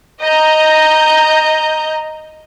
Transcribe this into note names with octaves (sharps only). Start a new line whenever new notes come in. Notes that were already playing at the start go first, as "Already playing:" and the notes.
D#5 A#5 G6